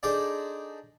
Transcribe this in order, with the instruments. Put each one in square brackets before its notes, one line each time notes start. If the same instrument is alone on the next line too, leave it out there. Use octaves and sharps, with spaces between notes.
[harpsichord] D4 D#4 G#4 A4 C5 D5